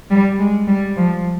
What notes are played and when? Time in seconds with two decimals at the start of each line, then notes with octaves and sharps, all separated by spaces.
0.11 G3
0.39 G#3
0.67 G3
0.97 F3